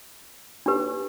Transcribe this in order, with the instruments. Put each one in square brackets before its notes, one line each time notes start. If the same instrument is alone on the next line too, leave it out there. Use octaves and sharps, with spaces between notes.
[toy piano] D4 G4 B4